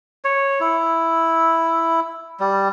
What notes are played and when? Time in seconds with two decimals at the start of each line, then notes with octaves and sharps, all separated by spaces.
0.24 C#5
0.60 E4
2.40 G3